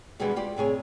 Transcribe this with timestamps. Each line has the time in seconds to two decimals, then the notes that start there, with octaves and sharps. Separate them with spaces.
0.20 B2 D3 E3 G3 G#3 B3
0.36 F4 G4 D5
0.57 A2 C3 G#4 C#5